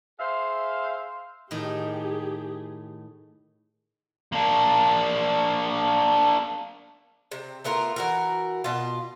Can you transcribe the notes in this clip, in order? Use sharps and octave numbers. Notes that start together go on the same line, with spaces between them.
G#4 C5 E5 F5
A2 D#3 D#4 G4 G#4
A#3 D4
C3
A3 B3 F4 A#4
E3 F#4 A#4
B2 F4